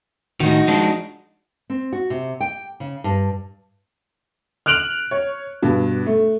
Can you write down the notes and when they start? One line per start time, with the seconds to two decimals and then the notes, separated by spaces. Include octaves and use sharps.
0.40 A2 D#3 D#4 F#4
0.68 F3 G#3 D4
1.70 C4
1.93 F#4
2.10 C3
2.41 G5
2.80 C#3
3.04 G2
4.66 F6 F#6 D7 F7 F#7
5.11 C#5
5.62 G2 B2
6.06 A3